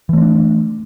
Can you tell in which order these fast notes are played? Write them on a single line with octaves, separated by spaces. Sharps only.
E3 A3 C4 D4